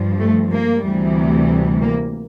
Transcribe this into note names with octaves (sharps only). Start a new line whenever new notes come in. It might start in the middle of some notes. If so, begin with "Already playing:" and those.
Already playing: G2 F3
A3
A#3
D2 C3 E3 G3
A#3